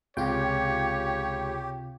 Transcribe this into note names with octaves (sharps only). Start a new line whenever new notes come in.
C#2 C3 F4 G4 C#5 G5